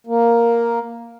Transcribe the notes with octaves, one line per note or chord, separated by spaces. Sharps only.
A#3